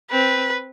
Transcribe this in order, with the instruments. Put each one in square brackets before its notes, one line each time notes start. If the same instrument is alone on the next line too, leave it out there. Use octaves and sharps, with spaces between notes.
[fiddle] C4 [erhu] B4